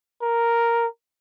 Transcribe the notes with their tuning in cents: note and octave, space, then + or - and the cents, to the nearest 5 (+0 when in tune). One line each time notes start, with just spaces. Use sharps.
A#4 +0